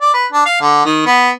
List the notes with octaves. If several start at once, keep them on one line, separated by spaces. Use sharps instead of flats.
D5
B4
D4
F5
D3
D#3
B3